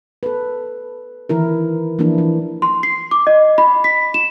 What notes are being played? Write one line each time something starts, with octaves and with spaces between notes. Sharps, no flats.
A4 B4
D#3 E3 E4 A#4
E3 F3 A#3 D4 E4
E3
C6
C7
D6
D#5
B5
B6
E7